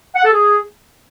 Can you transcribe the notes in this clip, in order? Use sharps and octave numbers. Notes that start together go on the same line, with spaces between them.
F#5
A4
G#4